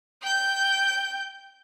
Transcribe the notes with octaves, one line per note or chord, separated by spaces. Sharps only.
G5 G6